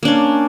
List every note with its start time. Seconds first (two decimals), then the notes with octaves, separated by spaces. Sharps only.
0.03 A#3
0.05 D4
0.08 C#4